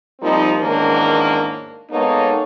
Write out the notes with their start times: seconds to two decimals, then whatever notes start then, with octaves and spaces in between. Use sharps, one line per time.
0.21 F3 G3 A#3 C4 D#4
0.60 E2 G#2 D#3 A#3 C#4 D4
1.91 G#3 A#3 B3 D#4 A4 C#5